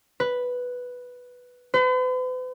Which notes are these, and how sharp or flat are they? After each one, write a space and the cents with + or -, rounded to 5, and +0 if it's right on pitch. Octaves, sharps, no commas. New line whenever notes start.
B4 +0
B4 +45